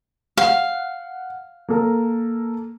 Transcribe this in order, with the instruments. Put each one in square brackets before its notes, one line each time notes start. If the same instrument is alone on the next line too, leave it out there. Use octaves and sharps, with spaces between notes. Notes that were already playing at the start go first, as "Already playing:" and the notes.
[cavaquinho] F5 [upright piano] F#5
[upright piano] A#3 A4 A#4